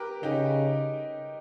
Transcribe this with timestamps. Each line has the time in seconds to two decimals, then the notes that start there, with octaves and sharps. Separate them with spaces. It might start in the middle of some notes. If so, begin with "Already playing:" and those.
Already playing: G4 A#4 B4
0.22 C#3 D#4 G4